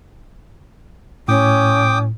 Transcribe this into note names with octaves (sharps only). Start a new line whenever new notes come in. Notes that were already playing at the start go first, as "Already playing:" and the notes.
A2 C#4 G5 D6 D#6